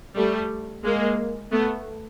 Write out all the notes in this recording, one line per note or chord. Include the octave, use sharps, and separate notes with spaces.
G3 A3
G#3 A#3
A3 B3